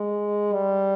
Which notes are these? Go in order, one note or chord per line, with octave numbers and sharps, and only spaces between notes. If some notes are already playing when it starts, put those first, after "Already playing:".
Already playing: G#3
G3